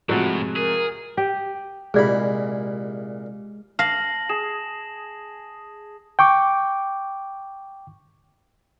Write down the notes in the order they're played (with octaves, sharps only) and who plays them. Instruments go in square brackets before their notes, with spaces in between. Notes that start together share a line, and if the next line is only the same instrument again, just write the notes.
[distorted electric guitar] A2 [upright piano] C3 F3 G#3 [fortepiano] F#3 F#4
[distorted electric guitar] G#4 [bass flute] A#4
[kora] G4
[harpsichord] C2 A#2 B5 [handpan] G#3 [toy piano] G#4 D5
[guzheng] F5 [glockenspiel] A5 A#6 F#7
[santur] G#4 [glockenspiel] E7
[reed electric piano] G5 C#6 D6